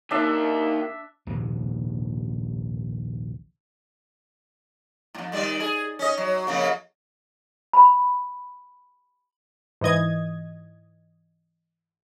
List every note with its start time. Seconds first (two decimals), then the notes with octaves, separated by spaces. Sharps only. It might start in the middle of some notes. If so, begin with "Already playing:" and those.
0.11 D#3 A#3 D4 E5
1.27 A#1 D#2 G#2 C3
5.15 F2 A2
5.32 D#3 G3 D5
5.60 G#4
5.99 C#4 D#5
6.18 F#3
6.47 F2 C#3 A#3
7.73 B5
9.81 G#2 E3 D#5 G#6